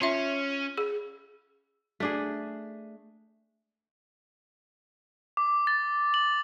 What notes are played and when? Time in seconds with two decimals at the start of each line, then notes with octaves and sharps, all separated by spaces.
0.02 C#4 F4 E5
0.78 G#4
2.00 A3 D4 G#4
5.37 D6
5.67 A6
6.14 F#7